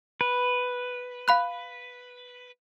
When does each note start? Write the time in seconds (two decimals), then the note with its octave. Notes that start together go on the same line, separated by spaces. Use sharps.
0.21 B4
1.28 F5 B5 F#6